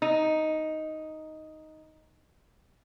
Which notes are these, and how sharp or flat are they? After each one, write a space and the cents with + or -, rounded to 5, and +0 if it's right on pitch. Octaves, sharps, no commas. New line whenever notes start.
D#4 +5